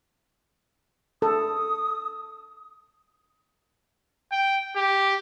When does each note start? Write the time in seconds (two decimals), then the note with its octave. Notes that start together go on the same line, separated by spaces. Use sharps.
1.22 A4 D#6
4.31 G5
4.76 G4